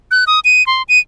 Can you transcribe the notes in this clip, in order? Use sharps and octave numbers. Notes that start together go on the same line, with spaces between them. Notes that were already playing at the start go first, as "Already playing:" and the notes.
F#6
D#6
D#7
C6
D#7